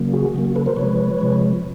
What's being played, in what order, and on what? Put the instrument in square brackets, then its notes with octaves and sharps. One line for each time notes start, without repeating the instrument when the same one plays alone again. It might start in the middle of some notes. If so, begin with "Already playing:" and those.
Already playing: [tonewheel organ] C#3 F#3 A#3
F#4 G#4
C#3 F#3 A#3
F#4
A4 B4
A#4 C5
C3 F3 G#3 B4 C#5
C3 F3 G#3